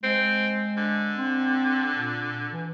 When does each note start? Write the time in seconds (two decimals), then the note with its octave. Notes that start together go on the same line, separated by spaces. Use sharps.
0.03 G#3 C4
0.77 D3
1.16 C4
1.93 A#2
2.52 E3